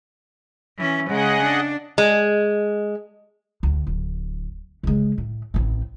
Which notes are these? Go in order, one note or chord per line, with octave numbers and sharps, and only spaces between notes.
E3 C#4
C#3 G#3 G#4 D#5 F#5
D4
G#3
D2
D1
C#3 G#3
A2
A1 C4